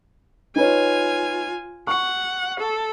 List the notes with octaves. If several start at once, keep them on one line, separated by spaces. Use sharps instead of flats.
D#4 F4 B4 C#5 G#5
F#5 C#6
A4